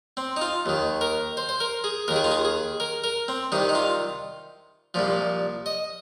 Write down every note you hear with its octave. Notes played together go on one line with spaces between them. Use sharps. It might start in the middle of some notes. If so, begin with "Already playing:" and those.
C4
D#4
F4
D#2 D#3
A#4
C5
C5
A#4
G#4
D#2 D#3 A#4
G#4
F4
G#4
G#4
A#4
A#4
C4
C2 C3 D#3 D#4
D#4
F4
C2 A#2 F3
D#5